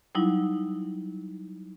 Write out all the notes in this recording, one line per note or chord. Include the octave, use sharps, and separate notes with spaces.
F#3 G3 D#4 E4